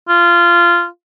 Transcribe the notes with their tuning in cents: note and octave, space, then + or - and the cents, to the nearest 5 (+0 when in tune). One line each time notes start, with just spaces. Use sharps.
F4 -15